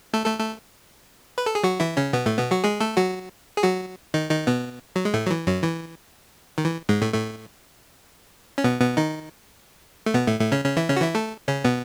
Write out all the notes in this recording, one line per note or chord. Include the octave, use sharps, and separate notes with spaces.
A3 A4
A3 A4
A3 A4
B4
A4
G#4
F#3 F#4
E3 E4
C#3 C#4
B2 B3
A2 A3
B2 B3
F#3 F#4
G#3 G#4
A3 A4
F#3 F#4
G#4
F#3 F#4
D#3 D#4
D#3 D#4
B2 B3
F#3
G#3
A2 A3
F#3
E3
F#2 F#3
E3
D#3
E3
G#2 G#3
A2 A3
A2 A3
C#4
B2 B3
B2 B3
D#3 D#4
A3
B2 B3
A2 A3
A2 A3
C#3 C#4
C#3 C#4
E3 E4
C#3 C#4
F#4
E3 E4
A3 A4
C#3 C#4
B2 B3